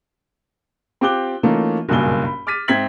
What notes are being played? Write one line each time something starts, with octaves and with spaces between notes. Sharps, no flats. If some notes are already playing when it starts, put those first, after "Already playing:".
C4 F4 G4 D6 F#6 G7
E3 A3 A#3 C#4 D#4 F4
F#1 B1 G2 A#2 G#5 G7
B5
D6 F6 A6 B6 D#7
G#2 C4 E5 G#6 B6 F#7